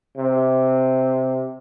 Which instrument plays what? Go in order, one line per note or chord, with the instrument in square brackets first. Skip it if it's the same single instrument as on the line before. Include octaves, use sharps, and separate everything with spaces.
[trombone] C3